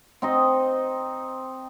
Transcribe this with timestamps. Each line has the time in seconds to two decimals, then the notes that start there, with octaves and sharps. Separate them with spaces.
0.22 C4 D#4 D#5